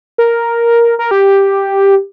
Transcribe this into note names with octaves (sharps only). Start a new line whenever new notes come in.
A#4
A#4
G4